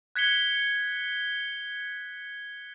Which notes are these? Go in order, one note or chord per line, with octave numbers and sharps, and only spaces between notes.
F#6 G#6 B6 C#7 G7